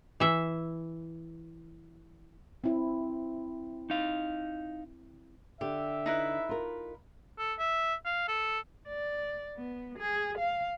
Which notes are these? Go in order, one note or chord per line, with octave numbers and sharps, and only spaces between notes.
E3 E5
C4 E4
D#4 F5
D3 G4 E5
D#4 E4 B4
F4 A#4
A4
E5
F5
A4
D5
B3
G#4
F5